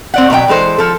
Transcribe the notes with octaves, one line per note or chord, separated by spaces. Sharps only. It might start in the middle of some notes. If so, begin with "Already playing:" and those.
C4 D5 F#5
B2 F#3 D5 G5
E3 G#3 A4 C5
F3 A4